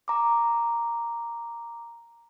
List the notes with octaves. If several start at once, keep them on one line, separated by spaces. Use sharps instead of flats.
A#5 D6